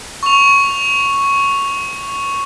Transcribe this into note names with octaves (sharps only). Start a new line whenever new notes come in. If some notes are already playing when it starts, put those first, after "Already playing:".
C#6 F7